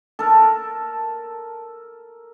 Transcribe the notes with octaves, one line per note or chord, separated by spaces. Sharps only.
A4 A#4